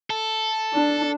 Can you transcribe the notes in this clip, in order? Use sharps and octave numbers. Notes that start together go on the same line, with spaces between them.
A4
D4